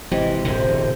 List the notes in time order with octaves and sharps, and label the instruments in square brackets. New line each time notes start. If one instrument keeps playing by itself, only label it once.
[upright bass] G#1 [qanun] C3 [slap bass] E3 [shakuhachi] D#5
[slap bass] E1 A2 D3 [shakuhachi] C5 [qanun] D#5